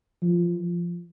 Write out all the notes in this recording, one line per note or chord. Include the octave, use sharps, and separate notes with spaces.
F3